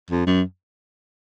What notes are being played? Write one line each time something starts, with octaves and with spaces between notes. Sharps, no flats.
F2
F#2